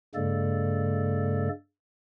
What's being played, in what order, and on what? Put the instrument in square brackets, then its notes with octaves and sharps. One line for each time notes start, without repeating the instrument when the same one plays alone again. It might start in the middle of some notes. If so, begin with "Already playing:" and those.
[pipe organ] G2 C#3 G#3 A#3 A4 D5